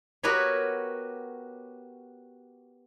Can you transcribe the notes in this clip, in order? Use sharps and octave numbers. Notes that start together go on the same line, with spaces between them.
B3 F#4 G4 A#4 B4 C#5